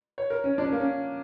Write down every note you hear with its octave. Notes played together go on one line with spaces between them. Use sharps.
C#5
A#4
C#4
D4
C#4
A#3
C#4